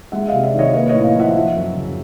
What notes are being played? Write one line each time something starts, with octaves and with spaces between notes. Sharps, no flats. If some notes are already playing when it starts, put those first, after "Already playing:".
G#3 E5 F#5
C3 D#5 F5
D5 E5
D#3
C#5 D#5
A#3 B4 C#5
C#5 D#5
A2
D#5 F5
F3 E5 F#5
F3
F#2
C#3